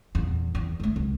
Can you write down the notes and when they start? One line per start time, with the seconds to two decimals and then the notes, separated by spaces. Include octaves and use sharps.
0.15 E2 A#2
0.55 E2
0.80 A3 B3
0.96 C#2